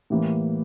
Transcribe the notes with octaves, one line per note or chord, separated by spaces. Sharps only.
A2 E3 G3 A#3